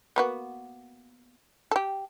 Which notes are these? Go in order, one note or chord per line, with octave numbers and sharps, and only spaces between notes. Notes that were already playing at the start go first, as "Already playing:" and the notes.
A#3 B3 F#4
G4 A4